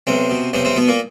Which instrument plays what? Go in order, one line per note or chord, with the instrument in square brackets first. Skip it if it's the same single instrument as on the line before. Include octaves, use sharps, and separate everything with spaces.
[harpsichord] B1 C3 C4
B2
B1 C3 C4
C3 C4
B2 B3
A#2 A#3